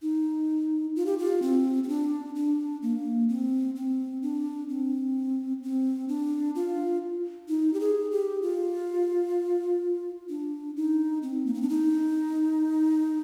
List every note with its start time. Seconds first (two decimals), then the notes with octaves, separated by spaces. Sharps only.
0.02 D#4
0.96 F4
1.06 G4
1.18 F4
1.42 C4
1.84 C4
1.88 D4
2.35 D4
2.82 A#3
3.29 C4
3.75 C4
4.22 D4
4.69 C4
5.63 C4
6.08 D4
6.55 F4
7.49 D#4
7.74 G4
7.81 G#4
8.11 G4
8.42 F4
10.29 D4
10.76 D#4
11.22 C4
11.46 A#3
11.54 C4
11.62 D4
11.69 D#4